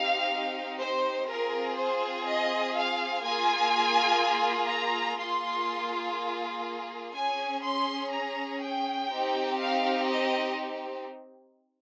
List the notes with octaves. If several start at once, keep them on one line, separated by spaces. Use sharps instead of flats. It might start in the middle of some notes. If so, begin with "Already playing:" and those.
Already playing: C4 D#4 G4 F5
C5
C4 F4 G#4 A#4
C5
D#5
F5
A#3 F4 G#4 G#5
A#5
A#3 F4 G#4 C6
C#4 G#4 G#5
C6
A#5
G5
C4 D#4 G4
F5
D#5